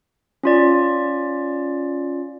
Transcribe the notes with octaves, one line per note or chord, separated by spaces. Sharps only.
C#4 F4 D5